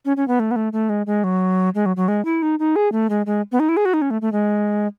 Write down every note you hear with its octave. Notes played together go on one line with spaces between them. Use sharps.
C#4
C#4
B3
A3
B3
A3
A3
G#3
G#3
F#3
G#3
F#3
F#3
G#3
E4
D#4
D#4
G#4
A3
G#3
G#3
B3
D#4
E4
G#4
F#4
D#4
C#4
A3
A3
G#3